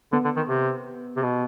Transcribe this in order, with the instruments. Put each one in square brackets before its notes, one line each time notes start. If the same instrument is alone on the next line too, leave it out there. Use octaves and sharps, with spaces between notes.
[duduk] D3 [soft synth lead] B3
[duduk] D3
D#3
C3
C3
B2